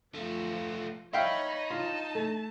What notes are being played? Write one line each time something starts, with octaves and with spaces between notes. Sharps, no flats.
F3 A3 F4
D#4 C#5 E5 F5 G5 B5
F4 A5
A3